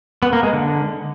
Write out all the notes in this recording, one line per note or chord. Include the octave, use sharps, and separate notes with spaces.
B3
A#3
G#3
D3